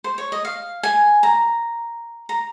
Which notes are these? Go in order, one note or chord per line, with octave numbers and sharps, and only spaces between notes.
C5
C#5
D#5
F5
G#5
A#5
A#5